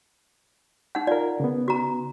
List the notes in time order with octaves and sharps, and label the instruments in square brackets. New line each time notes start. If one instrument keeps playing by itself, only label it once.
[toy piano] D#4 F#5
[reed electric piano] F4 A#4 [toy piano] D5
[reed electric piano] C#3 B3
[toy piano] F#4 A#5